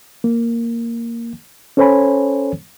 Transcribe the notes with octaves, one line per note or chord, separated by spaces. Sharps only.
A#3
C#4 A4 C5 C#5 G#5 B5